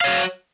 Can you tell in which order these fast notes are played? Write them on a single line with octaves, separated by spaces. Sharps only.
F5 C#5 F#4